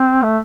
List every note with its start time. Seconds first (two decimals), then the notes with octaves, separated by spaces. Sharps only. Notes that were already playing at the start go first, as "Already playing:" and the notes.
Already playing: C4
0.23 A3